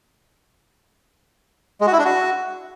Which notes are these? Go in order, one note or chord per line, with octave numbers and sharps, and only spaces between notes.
G#3
F#4
E4
D4
F#4